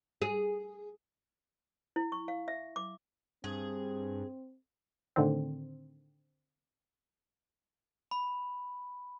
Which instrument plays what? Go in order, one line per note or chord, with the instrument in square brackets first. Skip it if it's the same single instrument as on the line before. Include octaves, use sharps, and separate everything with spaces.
[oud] G#4
[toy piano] E4
C#6
F5
E5
D6
[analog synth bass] G2 [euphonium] C4 [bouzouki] G#4
[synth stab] A2 D3 D#3 C4
[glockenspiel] B5